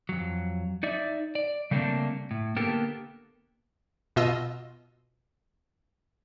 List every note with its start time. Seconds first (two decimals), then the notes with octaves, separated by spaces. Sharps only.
0.09 F2 F#3
0.83 D#4 D5 E5
1.35 D5
1.71 C#3 G3 A3 A#3 C4 D4
2.31 A2
2.57 D3 A#3 B3 G4 A4 A#4
4.16 B2 F4 D#5 E6